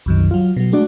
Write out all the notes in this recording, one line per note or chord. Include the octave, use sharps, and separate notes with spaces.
C2 F#2 D#3
F#3 F4
B2 F#3
G#3 A3 D4 F#4 D5